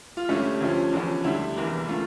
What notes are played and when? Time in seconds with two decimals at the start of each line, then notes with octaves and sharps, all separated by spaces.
0.17 F4
0.28 G2 D3 A3 C#4 E4 G4
0.60 D2 D3 F3 C#4
0.92 E2 D3 F3 C#4
1.24 D2 D3 G3 E4
1.56 F1 E2 E3 A#3
1.88 D3 A3 F4